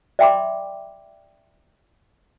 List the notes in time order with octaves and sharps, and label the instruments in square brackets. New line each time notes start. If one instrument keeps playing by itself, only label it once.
[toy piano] D5 E5 G5 B5 C6 D6